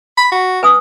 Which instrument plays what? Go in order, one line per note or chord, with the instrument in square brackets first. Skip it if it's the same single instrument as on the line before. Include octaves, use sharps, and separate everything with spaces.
[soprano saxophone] B5
F#4
[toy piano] B4 G#5 D#6